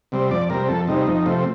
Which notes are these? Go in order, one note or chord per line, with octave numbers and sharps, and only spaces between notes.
C3 G3 C4
F2 D5
C3 G3 C4 A#4
F2 A4
C3 G3 C4 D#4
F2
C3 F3 A3 C4